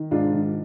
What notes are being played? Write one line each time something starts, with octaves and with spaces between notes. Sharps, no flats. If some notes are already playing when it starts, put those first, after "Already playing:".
Already playing: D#3
G#2 D4 F4
D#3